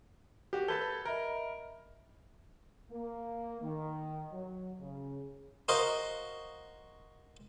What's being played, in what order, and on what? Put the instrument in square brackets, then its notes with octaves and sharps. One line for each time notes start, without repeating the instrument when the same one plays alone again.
[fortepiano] F#4 G4
[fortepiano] A4 B4 A5 [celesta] G6 G#6 G7
[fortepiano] A#4 [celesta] D#5 E5 B5
[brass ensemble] A#3
D#3
F#3
C#3
[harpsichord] F#4 A#4 C5 D#5 F5